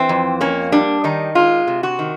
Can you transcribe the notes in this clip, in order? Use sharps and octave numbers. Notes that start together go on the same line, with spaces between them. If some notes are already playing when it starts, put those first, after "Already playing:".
Already playing: E3 C4
F2
A#3 C#4
G3 D4
D#3 D#4
G#3 F4
C3
F#4
D#3